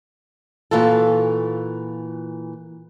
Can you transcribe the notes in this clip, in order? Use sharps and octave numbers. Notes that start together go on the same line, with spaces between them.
A#2 E3 F4 F#4 A4